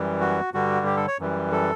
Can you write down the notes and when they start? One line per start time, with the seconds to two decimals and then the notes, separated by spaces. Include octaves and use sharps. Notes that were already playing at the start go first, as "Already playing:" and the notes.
Already playing: F#2 E3 G3
0.20 F#4
0.53 G2 D3 G3 F#4
0.86 G4
0.96 A4
1.08 C#5
1.19 F#2 E3 G3
1.52 A4